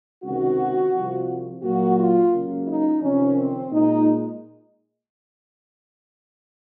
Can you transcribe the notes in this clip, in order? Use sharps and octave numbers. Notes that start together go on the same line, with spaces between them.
C#2 C3 D#3 F#4
C2 C3 F3
A#2 F#3 A#3 F#4
F4
C#2 C#3 F#3 A#3
D#4
F2 C3 D#3 C#4
C4
A#2 G#3 D#4